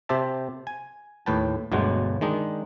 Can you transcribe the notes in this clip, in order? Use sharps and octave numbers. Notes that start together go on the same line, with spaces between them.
C3 G4 C5 E5 A5
G#5
D#2 A2 B4 G5 A5
G1 D2 B2 F#3 G#3 F#5
D#3 G#3 D4 D#4